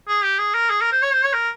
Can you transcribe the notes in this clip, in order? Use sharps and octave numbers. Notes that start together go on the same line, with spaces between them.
G#4
G4
G#4
A#4
G#4
A#4
C5
C#5
C5
C#5
A#4